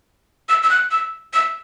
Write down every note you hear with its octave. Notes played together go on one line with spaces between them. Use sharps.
E6
E6
F#6
E6
E6